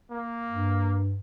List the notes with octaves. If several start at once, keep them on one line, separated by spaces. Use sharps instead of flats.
A#3
G2